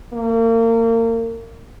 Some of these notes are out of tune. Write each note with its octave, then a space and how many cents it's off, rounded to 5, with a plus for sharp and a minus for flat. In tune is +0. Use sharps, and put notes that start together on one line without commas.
A#3 -35